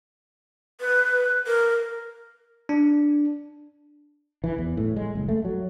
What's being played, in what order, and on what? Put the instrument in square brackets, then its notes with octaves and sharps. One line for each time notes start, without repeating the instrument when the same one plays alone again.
[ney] B4
A#4
[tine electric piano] D4
[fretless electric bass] E3
E2
A2
G#3
F#1
A3
F#3